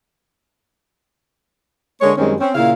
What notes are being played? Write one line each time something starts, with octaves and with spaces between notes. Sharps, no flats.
D3 G#3 A#3 C#5
F#2 D#3 G3 G#3 C4 C#4
C4 C#4
A#2 C#3 E4 F5